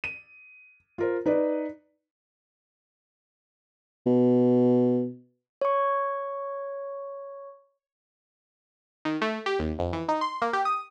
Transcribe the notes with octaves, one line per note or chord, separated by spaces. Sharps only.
D#7
F4 A#4 C5
D#4 B4 D5
B2
C#5 C#6
D#3
A3
G4
D#2
F2
E3
D#4
C6
A#3
G4
D#6